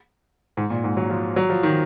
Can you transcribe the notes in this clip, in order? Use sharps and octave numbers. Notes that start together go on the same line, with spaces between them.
G#2
A#2
G#2
F#3
F3
F#3
F3
D#3